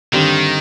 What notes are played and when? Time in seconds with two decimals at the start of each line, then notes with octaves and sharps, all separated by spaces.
0.13 G2 D3 D#3 G3 C4